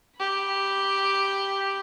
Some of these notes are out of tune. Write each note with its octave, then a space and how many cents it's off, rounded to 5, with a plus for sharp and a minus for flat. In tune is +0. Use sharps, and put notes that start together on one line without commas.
G4 +0 B5 +0